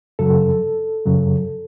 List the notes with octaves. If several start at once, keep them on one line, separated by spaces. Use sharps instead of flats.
F#2 C#3 F#3 A4
F#2 C#3 F#3